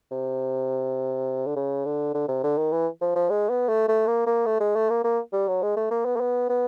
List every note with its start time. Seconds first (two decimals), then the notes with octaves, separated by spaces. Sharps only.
0.11 C3
1.46 D3
1.56 C#3
1.85 D3
2.14 D3
2.28 C3
2.43 D3
2.57 D#3
2.72 E3
3.01 F3
3.15 F3
3.30 G#3
3.50 B3
3.69 A3
3.88 A3
4.07 A#3
4.27 A#3
4.46 A3
4.60 G#3
4.75 A3
4.90 A#3
5.04 A#3
5.33 G3
5.48 F#3
5.62 G#3
5.76 A3
5.91 A#3
6.05 B3
6.16 A#3
6.20 B3
6.49 B3